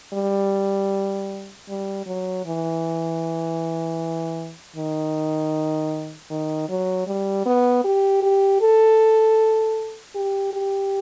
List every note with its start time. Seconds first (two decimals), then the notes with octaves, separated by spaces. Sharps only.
0.13 G3
1.69 G3
2.06 F#3
2.45 E3
4.76 D#3
6.30 D#3
6.69 F#3
7.07 G3
7.46 B3
7.84 G4
8.23 G4
8.61 A4
10.15 G4
10.53 G4